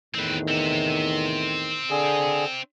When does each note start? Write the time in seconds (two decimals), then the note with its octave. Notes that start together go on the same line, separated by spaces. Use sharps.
0.14 E2 A2 D#3 C4 B4
0.48 C4 E5
1.90 D3 G#4